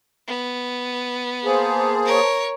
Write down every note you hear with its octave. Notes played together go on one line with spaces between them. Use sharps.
B3
A#3 G#4 C5 A5
A#4 C#5